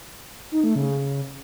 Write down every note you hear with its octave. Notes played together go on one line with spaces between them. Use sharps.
D#4
A3
C#3